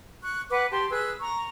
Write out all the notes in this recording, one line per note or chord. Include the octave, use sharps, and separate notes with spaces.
C#6 F#6
B4 F#5 D6
G4 A5 C6
G#4 B4 E6 F#6
A#5 C#6